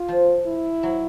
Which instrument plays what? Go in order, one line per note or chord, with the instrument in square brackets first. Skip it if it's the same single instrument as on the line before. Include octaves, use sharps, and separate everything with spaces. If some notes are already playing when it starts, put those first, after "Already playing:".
Already playing: [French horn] F4
[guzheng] F3
[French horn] E4
[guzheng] F#3